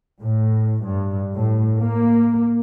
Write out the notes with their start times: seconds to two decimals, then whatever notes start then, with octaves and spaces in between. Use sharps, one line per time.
0.20 A2
0.85 G2
1.35 A2
1.79 A#3